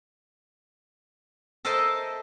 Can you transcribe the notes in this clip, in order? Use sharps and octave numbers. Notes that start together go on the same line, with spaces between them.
A4 A#4 C5 D#5 E5 A5